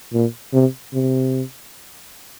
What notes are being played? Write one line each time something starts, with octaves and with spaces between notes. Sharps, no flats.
A#2
C3
C3